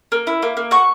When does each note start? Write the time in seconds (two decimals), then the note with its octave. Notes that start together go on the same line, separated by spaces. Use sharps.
0.12 A#3
0.27 E4
0.43 A#3
0.57 A#3
0.71 F#4 C#6